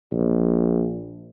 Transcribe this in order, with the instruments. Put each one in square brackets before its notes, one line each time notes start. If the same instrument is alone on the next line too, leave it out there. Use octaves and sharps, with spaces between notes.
[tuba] A#1